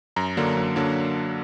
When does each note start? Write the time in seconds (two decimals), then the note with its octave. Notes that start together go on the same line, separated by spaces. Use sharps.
0.16 F#2 A#5
0.37 D3 F#3 A#3 D4
0.57 F#2
0.76 D3 F#3 A#3 D4